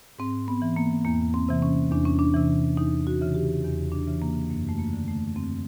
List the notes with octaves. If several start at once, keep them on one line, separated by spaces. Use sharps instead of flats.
G#2 C4
B3
E3
A#3
E2 A#3
C4
C3 E3
C#4
E2 D4
C#4
D4
C3 E3
E2 D#4
F#4
C#3 E3
G4
E2
D4
C#3 E3
A#3
F#2 A#3
A3
A#3
D3
A3
F#2 C4